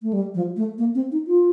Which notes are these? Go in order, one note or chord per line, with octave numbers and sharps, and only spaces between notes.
A3
G3
F3
A3
A#3
C4
D#4
F4